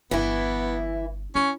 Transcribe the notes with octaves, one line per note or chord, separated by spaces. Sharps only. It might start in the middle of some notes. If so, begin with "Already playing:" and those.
G1 E3 B3 E4
C#4 E4